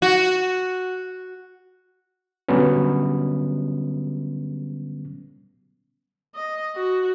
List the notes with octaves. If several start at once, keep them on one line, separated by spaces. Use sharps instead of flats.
F#4
D3 F#3 G3 B3 C#4
D#5
F#4